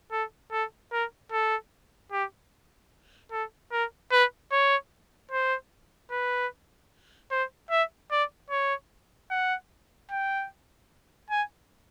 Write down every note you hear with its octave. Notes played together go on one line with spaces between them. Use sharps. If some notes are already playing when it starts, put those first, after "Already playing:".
A4
A4
A#4
A4
G4
A4
A#4
B4
C#5
C5
B4
C5
E5
D5
C#5
F#5
G5
G#5